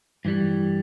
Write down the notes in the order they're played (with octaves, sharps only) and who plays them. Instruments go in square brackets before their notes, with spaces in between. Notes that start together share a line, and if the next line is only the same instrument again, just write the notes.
[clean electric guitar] G2 E3 G3